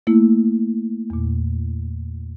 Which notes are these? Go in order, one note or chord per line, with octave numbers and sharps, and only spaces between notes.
A3 A#3 E4
E2 A#2